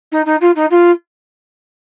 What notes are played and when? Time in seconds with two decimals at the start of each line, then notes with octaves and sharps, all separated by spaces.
0.12 D#4
0.26 D#4
0.41 F4
0.55 D#4
0.70 F4